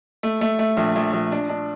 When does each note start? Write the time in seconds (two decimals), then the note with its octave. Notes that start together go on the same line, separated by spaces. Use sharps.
0.23 A3
0.41 A3
0.59 A3
0.77 A#1
0.96 A#1
1.13 A#1
1.32 D4
1.50 D4